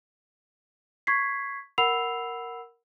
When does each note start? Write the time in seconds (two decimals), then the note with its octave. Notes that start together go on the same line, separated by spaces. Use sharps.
1.07 C#6 G#6 B6 C7
1.78 A#4 F#5 B5 E6 C7 F7